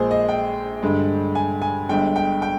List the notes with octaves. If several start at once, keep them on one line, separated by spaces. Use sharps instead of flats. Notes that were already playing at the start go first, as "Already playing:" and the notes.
Already playing: A#1 A#2 G#3 G#4 C5
D#5
G5
G2 D3 G#3
G#5
G#5
G1 G2 D3 G#3 G5
G5
G5